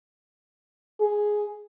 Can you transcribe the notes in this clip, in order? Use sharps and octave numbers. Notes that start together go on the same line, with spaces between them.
G#4